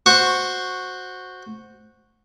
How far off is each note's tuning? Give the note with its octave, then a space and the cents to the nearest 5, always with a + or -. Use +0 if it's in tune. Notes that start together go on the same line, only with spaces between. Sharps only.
F#4 -10 C5 +0 C#6 -5